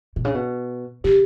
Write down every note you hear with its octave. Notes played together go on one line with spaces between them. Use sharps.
B2
C#3
B2
C#3 G4